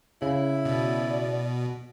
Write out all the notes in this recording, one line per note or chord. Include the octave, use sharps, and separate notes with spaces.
C#3 E4
B2 D5